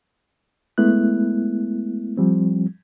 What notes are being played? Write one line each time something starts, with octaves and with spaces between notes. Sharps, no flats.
G#3 A3 B3 E4 F#6
F3 G3 C4